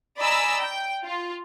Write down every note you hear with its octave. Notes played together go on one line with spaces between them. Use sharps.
D5 D#5 G#5 A#5 B5 E6
G5
F4